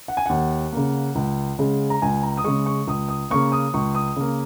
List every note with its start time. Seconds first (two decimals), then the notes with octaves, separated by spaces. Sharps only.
0.08 F#5
0.17 G#5
0.26 D#2 F#5
0.72 C#3 A#3
1.15 C#2
1.59 C#3 G#3
1.90 A#5
2.02 C#2 G#5
2.23 A#5
2.37 D#6
2.44 C#3 G#3 C#6
2.66 C#6
2.87 C#2 D#6
3.09 D#6
3.30 C#3 A#3 C#6
3.52 D#6
3.74 C#2 C#6
3.95 D#6
4.16 C#3 A#3